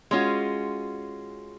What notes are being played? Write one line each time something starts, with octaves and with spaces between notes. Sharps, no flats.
G#3 C#4 F4 F#4